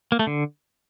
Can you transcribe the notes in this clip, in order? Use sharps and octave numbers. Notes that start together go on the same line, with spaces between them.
A#3
A3
D3